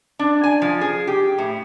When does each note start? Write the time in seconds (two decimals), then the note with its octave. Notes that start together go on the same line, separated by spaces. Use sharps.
0.19 D4
0.44 G#5
0.62 F3
0.81 G#4
1.07 G4
1.38 A2